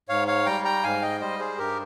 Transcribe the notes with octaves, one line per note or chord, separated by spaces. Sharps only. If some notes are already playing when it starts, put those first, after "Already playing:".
G#2 C#5 F5
C#5 F5
G3 G5 A#5
G5 A#5
G#2 F5 G#5
D#5 G5
G3 C5 D#5
G#4 C5
G2 G4 A#4